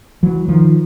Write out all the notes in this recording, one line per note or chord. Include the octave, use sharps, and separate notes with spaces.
E3 F#3
D#3 F3